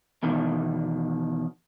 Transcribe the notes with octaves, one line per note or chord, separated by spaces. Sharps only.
E2 B2 D#3